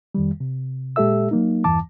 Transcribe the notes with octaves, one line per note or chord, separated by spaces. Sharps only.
F2 D#3 G3
C3
A#2 G#3 G4 A4 E5 E6
F#3 A#3 D#4
E2 G2 E3 A5 D6